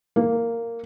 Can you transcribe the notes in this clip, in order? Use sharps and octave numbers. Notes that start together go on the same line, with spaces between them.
A#3